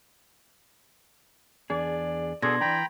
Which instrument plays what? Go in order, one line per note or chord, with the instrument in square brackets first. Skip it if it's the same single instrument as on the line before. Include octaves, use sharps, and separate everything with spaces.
[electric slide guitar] E2 D4 G#4 [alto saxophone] D5
[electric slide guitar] B2 B3 [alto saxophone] D4 [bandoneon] G#4 A4 [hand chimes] C6 G#6 A#6
[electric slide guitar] D#3 E3 [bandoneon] G5 A#5 B5